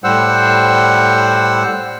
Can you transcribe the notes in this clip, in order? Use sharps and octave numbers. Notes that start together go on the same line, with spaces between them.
A2 G3 C5 F#5 E6